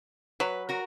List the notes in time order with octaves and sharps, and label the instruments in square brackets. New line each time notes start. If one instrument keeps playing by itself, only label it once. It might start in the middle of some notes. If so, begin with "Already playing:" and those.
[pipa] F#3 [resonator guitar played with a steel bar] B4
[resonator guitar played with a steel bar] F#4 A#4